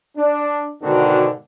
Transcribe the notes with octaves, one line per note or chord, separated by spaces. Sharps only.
D4
G#2 B2 D3 D#3 D4 F#4